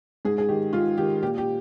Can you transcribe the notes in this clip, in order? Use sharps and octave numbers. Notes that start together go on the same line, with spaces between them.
G#2 G#4
G#4
D#3 G4
G#2 F4
D#3 G4
A#2 G4
G4